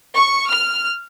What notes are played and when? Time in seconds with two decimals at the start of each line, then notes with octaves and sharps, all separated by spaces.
0.14 C#6
0.48 F6